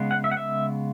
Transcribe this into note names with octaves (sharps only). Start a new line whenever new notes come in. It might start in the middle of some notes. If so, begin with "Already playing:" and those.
Already playing: C#3 G#3 B3
F#5
E5
F#5
E5